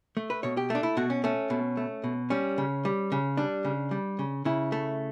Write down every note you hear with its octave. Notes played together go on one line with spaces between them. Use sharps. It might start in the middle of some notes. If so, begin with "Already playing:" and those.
A3
B4
B2 C#5
G4
A3 D4
E4
B2 F#4
C#4
A3 C#4
B2
A3
B2
G3 C#4
C#3
G3
C#3
G3 D4
C#3
G3
C#3
C#3 E4
A3